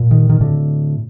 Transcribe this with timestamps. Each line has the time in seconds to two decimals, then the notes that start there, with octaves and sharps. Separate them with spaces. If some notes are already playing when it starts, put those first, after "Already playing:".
Already playing: A#2
0.11 D#3
0.29 D#3
0.40 A2 D3